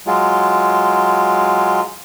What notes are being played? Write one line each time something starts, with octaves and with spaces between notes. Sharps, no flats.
F#3 G#3 F4